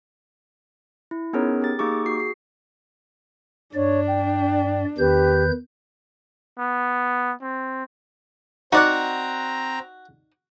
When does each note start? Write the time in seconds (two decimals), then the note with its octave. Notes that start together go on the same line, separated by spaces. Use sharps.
1.11 E4
1.33 B3 C#4 D#4 G#4 A#4 C#5
1.62 G4 A6
1.79 A#3 D#4 G4 G#4 C#6 D6
2.06 F#4 C7
2.18 G#4 C7
3.74 G2 D4 C#5 D5
4.07 G5
4.98 E2 D#3 G4 B4 G6
6.59 B3
7.42 C4
8.72 C4 D#4 F#4 D5 F#5 A#5